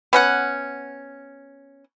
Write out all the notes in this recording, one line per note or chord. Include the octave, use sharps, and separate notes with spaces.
B3 C#4 F#5